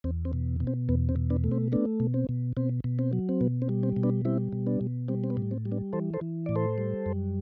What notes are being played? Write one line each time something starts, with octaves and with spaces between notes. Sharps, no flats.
E2 C4
C4
B2
B2
C4
E2 B3
C4
B2
B3 D4
A3
C4
A3 B3 D4
B2
C4
B2
B2 C4
B2
C4
F#3
C4
B2 B3
C4
G3
C4
B2
B3 D4
G3 C4 E4
B2
B3 D4
B2
G3 C4
C4
B3
A2
C4
G3
B3 D4
E3 A4 C5
A4 C5
E3
A2 D5
A4 C5
G3
F#2